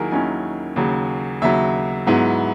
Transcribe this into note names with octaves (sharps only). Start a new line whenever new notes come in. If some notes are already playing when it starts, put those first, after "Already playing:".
Already playing: D#2 D#3 F#3 E4 G#4 A#4
D#2 D#3 F#3 C#4 E4 G#5
D#2 C#3 F#3
D#2 C#3 F#3 E5
G#2 F#3 B3 E4